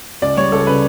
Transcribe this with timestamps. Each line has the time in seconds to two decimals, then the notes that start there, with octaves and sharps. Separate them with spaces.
0.22 C#2 D5
0.37 G3 C#5
0.52 C#2 A4
0.67 C#3 B4